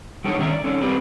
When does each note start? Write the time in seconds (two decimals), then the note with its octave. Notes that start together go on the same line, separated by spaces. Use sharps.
0.24 F#3 D4 D#4 G4 A4 C#5
0.38 C#2 D#3 C#4 D4 E5 A#5
0.50 D5
0.64 C#4 D#4 A4 C#5
0.81 C4 G4 G#4 B4 C5 D5